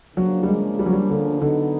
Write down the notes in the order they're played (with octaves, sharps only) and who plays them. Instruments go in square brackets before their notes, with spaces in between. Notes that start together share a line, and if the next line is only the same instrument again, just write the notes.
[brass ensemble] D2 C#3 F3 A#3 D4 [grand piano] F#3
[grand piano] G3
G#3
G3
F#3
G3
D3
[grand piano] D3 [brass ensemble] F#3 B3 D#4